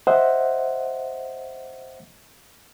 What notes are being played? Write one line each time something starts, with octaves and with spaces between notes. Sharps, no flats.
C5 D#5 E5 F#5